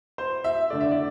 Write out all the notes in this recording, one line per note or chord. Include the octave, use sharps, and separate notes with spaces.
C5
E5
D3 A3 D5
E5
D5